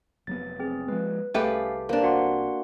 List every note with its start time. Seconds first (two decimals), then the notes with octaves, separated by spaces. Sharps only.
0.27 F1 F#3 B3 A6
0.59 C4 G#4
0.88 F3 G#3 B4
1.34 C2 A3 C#4 G4 G#4 B4 F5
1.89 A#3 D4 C5
2.03 F#4 F#5 C6